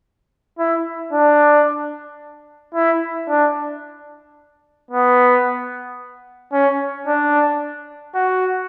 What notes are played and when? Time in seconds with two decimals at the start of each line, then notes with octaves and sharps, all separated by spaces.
0.59 E4
1.12 D4
2.74 E4
3.29 D4
4.91 B3
6.53 C#4
7.07 D4
8.15 F#4